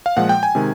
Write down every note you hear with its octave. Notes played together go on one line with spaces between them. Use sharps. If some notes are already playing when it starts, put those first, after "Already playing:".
F5
A#2 F3 G#3 F#5
G5
G#5
C3 D#3 G#3